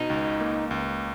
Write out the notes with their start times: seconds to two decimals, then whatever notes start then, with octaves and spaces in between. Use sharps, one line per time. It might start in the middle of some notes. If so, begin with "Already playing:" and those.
Already playing: B2 D#4
0.10 C#2
0.41 A#3
0.71 C#2